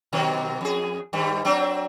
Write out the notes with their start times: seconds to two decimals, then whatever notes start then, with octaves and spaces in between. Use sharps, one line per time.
0.13 B2 D#3 F#3
0.61 F2 G#4
1.13 G2 D#3 G3
1.45 F#3 C4 D4